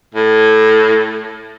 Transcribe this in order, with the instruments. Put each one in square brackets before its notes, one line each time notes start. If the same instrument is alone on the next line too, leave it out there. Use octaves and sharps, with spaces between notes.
[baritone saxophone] A2